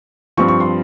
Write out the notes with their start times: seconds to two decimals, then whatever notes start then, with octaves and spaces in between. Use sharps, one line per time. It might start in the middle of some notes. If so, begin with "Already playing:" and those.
0.37 G2 F3 C4 C#6
0.48 C#6
0.60 C6